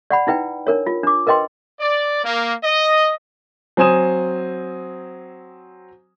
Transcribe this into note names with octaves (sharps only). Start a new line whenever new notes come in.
D5 F#5 B5
D#4 E4 B4 G5
D4 A#4 C#5
F4
D4 D6
A#4 B4 D#5 G5 C6
D5
A#3
D#5
F#3 C4 C5 G#5 D#6 E7